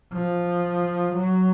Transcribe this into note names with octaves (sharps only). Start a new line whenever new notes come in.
F3
F#3